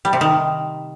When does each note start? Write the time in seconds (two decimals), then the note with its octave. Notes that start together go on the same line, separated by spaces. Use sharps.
0.05 G3
0.13 C3
0.21 D#3